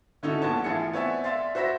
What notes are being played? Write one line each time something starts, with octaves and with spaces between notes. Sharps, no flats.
D3 C#4 D#4 E4 F#4 A4
A#1 B3 C#5 A5
A1 E4 F4 G#4 A5 C#7
B3 C4 C#5 D5 E5 G#5
D5 E5 F5 C6 A6
F#4 C5 E5 B5 A#6